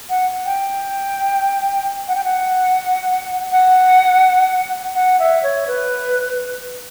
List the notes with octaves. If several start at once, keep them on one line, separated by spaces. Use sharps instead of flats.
F#5
G5
F#5
G5
F#5
F#5
F#5
E5
C#5
B4